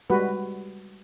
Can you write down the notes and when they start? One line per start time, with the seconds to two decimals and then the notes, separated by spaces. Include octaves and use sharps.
0.10 G3 G#3 F#4 B4